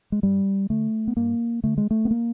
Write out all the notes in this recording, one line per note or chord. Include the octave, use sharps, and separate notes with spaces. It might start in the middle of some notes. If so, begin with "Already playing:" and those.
G#3
G2 G3
D3 A3
B3
G2 A#3
D3 A3
G#3
A3
B3
A#3